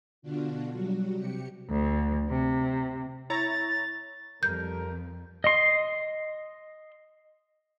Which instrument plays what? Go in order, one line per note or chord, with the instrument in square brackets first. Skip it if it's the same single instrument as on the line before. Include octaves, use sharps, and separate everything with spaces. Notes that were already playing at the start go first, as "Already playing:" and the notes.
[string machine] B2 D3 D4 F4 F#4
F#3 G3 F#4
C3 G4 C#7
[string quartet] D2
C3
[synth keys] E4 C#5 A#5 [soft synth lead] A6
[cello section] F2 [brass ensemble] G3 A4 A#4 [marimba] G6
[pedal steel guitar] D#5 C6